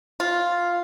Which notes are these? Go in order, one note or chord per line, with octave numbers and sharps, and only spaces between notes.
F4